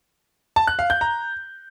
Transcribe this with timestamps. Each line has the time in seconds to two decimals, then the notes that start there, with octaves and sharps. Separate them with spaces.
0.56 A5
0.67 F#6
0.79 F5
0.90 G6
1.01 A#5